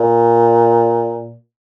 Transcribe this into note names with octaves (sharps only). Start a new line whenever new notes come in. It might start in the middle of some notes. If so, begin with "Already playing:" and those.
Already playing: A#2